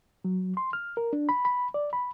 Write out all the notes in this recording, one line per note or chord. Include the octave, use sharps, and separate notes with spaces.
F#3
C6
F6
A#4
D4
B5
B5
D5
B5